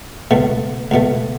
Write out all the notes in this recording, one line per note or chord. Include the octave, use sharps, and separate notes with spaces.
C#2 B2 A3
C#2 B2 A3